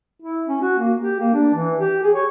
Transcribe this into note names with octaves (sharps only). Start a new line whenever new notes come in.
E4
C#4
F#4
A#3
G4
A#3
D4
E3
G4
G#4
C#5